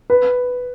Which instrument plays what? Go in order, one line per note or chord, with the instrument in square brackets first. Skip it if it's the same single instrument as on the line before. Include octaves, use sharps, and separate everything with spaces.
[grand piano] B4